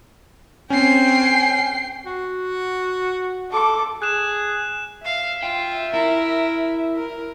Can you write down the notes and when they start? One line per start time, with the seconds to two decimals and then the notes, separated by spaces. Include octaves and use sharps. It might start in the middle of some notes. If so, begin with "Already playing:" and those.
0.70 C4 C#4 G5 G#5 C7
2.06 F#4
3.51 A4 D6
4.02 G#4 F#6 E7
5.05 E5 F5
5.43 F4 G5
5.94 E4 A#4
6.97 A#4